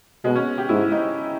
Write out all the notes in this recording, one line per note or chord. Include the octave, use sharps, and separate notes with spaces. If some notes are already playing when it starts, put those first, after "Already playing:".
B2 G#3
C#4
G4
G#2 E4
D#4